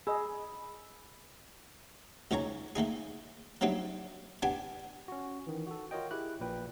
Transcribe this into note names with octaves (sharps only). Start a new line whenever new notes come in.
G#4 D#5 B5 E6
C#2 D#3 C#4 C#5 A#5
A3 A#3 D#4 G#4
F#3 G3 A3 C4 D4 D#4
B3 D4 G4 G#5
C#4 F#4
D#3 E3
F#4 A4
F4 F#4 A#4 C#5 D#5 G5
E4 G4 G#4 F#6
A#1 A#2 B4 G5